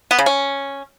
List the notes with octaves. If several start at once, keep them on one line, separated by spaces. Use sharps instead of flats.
B3
C#3
C#4